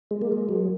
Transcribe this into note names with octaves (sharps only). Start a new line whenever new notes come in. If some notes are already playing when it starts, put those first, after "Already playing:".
G#3
A#3
G#3
F#3